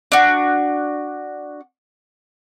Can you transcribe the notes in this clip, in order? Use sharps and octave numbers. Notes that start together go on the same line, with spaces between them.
D4 F#4